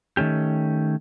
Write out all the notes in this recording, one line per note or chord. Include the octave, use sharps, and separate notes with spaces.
D#3 A3 C#4 G4